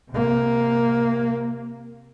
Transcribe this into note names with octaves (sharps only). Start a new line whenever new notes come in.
C3 A#3